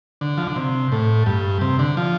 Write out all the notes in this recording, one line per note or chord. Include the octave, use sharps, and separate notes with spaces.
D3
F3
D3
C3
A2
G2
C3
D3
F3